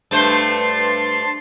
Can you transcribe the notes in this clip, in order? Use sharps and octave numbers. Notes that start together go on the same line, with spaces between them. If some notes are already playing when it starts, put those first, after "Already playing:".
G2 A3 C5 A5 C6